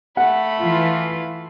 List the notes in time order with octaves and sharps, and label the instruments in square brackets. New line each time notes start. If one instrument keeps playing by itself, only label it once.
[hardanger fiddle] A3 B5 [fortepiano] F#5
[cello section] E3 F4